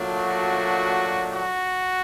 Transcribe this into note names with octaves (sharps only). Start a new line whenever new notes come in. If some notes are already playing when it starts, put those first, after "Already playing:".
Already playing: A#2 F#3 A3 D4
F#4
F#4